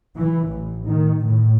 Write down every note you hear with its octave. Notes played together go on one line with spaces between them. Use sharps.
E3
A1
D#3
A2